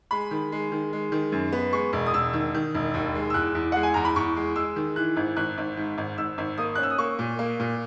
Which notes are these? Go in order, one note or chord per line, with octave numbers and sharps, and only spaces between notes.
G#3 B5
D#3
G#3
D#3
G#3
D#3
F#2
B3
G#3 C#6
E1
D#6
E1 E6
D#3
D#3
E1
D#2
G#3
E6
E2 F#6
E2
G#3 F#5
G#5
E2 A#5
B5
E2 C#6
G#3
G#3 E6
D#3
E3 F#6
G#1
G#1 F#6
G#1
G#2
G#1
G#1 E6
G#1
A#3 D#6
C#4 F#6
E6
D#6
A#3 C#6
A#2
A#3
A#2